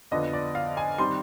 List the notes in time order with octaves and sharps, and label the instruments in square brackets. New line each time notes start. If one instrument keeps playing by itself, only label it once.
[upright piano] F2 D3 F3 B3 D4 D#5
D5
F5
G#5
D#3 G3 C4 C6